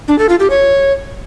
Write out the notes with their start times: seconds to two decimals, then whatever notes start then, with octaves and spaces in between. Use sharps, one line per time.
0.08 D4
0.19 A4
0.29 F4
0.40 G4
0.50 C#5